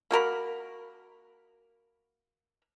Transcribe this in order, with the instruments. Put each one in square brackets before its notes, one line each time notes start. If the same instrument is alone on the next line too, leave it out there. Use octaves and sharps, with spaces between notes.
[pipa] A#3 F#4 A#4 B5